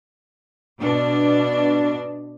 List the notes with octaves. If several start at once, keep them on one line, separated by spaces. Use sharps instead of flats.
B2 D4